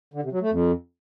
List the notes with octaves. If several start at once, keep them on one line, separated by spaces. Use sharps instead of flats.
D3
C3
F#3
A3
F2